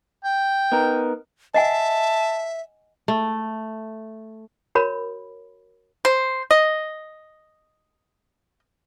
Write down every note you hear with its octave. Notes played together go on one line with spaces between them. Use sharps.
G5
B3 D#4 A#4
D#5 E5 F#5 G#5 A5
A3
F#4 A#4 C#5 B5
C5
D#5